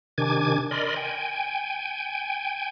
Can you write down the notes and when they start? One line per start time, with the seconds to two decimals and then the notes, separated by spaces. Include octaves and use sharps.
0.18 C3 D#3 D4 G#5 D6 G#6
0.71 A#4 D5 D#5 B5 C6
0.96 G5 G#5